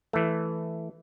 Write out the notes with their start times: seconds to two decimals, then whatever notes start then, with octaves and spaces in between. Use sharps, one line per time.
0.13 E3 A3